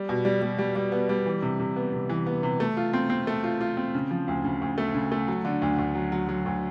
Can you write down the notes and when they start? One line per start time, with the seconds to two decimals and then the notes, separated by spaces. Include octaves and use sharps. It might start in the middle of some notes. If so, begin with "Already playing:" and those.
Already playing: G3
0.09 B2
0.25 G3
0.42 G3
0.58 G3
0.75 G3
0.92 B3
1.09 G3
1.26 E3
1.42 C3
1.59 C3
1.76 B3
1.93 C3
2.09 E3
2.26 B3
2.43 C3
2.60 A3
2.77 F4
2.93 C4
3.10 C4
3.27 A3
3.44 F4
3.61 F4
3.77 C4
3.94 C#3
4.11 F3
4.28 D2
4.44 C#3
4.62 D2
4.78 A3
4.95 C#3
5.12 A3
5.28 F#3
5.45 D3
5.62 D2
5.78 D2
5.95 F#3
6.12 F#3
6.29 F#3
6.46 D2